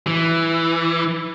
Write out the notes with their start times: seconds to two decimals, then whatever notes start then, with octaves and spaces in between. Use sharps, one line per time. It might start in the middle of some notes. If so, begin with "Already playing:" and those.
0.07 E3